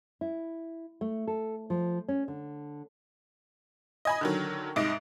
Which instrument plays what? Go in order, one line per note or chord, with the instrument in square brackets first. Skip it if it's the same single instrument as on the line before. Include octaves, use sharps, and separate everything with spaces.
[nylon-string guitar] E4
A3
A4
F3
C#4
D3
[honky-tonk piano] D#5 G#5 B5
D3 D#3 F#3
C2 G#2 D#5 D7